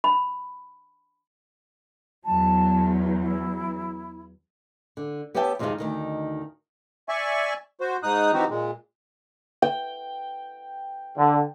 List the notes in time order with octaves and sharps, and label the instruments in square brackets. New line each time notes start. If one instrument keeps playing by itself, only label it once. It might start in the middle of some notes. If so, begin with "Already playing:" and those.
[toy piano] B5
[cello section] E2 F#3 [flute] A5
[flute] E4
[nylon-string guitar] D3
B3 G4 C#5 E5 G5 A5
F2 C3 D#3 G#3 D#4 F4
D2 D#3 D#4
[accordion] D5 E5 G#5 C#6
F#4 C5
G#2 D#4 D#6 F#6
E3 C4 D#4 F#4 G4
A#2 G#3
[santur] G5
[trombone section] D3